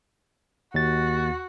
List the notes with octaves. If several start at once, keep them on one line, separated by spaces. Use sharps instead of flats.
D#2 F#4 A6